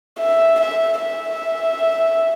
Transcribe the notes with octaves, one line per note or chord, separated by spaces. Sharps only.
E5
E5
E5